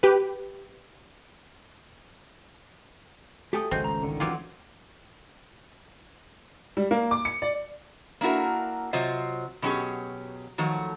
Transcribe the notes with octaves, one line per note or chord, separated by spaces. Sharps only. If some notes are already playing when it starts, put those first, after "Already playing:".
G4 B4
A3 G4 G5 G#5 D#6
G#1 C#2 F#3 G#3 C4 C#4 G6
A#5
D3 D#3
E3 F#3 E4 F4 G4
G3
A#3
D6
C#7
D5
A#3 D4 E4 F#4 A#4
C3 F#3 F4 C5 D#5
B2 F#3 C#4 G4 G#4
D#3 F3 F#3 A3